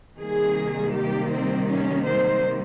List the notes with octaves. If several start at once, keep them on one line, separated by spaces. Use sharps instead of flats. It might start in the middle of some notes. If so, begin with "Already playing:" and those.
C3 D#3 G3 A#3 G#4
G4
C4
C#4
C5